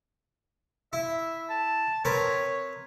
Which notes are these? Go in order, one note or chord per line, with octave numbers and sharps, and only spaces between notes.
E4 E5
A5
C4 A#4 B4 C#5